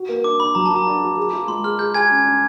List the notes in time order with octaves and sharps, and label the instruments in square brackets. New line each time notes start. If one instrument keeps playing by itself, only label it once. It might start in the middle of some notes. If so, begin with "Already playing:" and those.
Already playing: [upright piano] F#4
A#3
[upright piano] D4 [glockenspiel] D6
[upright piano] D4 [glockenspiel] B5
[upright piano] F#3 [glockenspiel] A#5
[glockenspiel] A5
[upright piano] F#4
[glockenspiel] A#5
[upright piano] D4
F#4
G#4
F4
[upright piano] G#3 [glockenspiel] C6
[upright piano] G#4 [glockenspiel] F6
[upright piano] G#4 [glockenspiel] G6
[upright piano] G#4 [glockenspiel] G#5 G#6
[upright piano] C#4
C#4